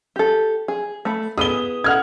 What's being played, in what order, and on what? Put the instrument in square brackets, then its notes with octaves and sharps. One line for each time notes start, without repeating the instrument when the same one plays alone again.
[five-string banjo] G4 A4
G#4
A3 B5
[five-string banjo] B3 E4 G#4 [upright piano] D#6 G7
[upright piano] F#5 F6 G#6